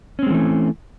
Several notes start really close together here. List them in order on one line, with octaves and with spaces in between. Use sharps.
C#4 C4 G#3 E3 A3